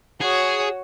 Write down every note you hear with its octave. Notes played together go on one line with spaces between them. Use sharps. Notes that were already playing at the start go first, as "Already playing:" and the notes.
F#4 G#4 C#5